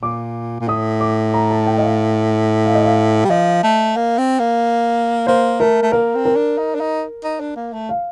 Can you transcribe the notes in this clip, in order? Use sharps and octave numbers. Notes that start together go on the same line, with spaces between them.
A#2 D6
A#2
A2 D#6
D6
A#5
A5
G5
D#5
F5
F5
D#5
F5
G3
F3 D#5
A3
A#3
C4
A#3
A#3 C5
A3 A#4
A3
A#3 A#4
C4
A#4
D4
D#4
D4
D#4
D#4
D4
A#3
A3
F5